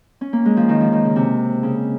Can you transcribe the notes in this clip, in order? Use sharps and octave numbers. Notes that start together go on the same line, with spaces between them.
C#4
A#3
G#3
F3
D#3
F3
D#3
C#3
C3
C#3